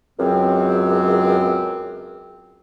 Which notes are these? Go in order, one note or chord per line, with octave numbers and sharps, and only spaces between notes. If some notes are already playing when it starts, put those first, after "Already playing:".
C#2 F#2 F#3 C4